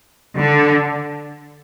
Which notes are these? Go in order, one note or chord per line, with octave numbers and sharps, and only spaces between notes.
D3